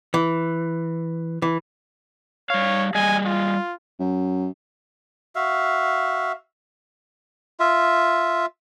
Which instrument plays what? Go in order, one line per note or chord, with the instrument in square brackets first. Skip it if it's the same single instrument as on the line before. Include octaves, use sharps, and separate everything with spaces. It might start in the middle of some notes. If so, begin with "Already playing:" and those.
[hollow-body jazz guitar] E3
E3
[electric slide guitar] G3 F5 [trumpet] C#5
[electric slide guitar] G3 G#4 D#5 [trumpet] G#5
[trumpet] F4
[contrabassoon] F#2
[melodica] F#4 E5 F5
F4 E5